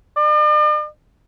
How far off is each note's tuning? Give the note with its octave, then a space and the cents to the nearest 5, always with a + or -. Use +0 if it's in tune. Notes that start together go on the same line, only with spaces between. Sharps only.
D5 +45